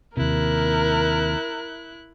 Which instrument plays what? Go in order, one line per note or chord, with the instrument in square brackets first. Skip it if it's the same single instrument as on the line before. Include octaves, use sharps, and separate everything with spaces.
[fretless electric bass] D#2 C3 [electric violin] E4 F#6 [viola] A#4